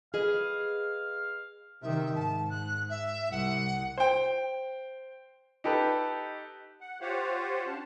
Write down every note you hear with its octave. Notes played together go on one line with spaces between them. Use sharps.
G#4 B4 D#5 F5
C3 D#3 E5
G#2 A5
F#6
E5
C2 F#5
C5 G5
D#4 G4 A4 B4
F#5
F4 G4 C5 C#5 F5 F#5
C#4 D4 A5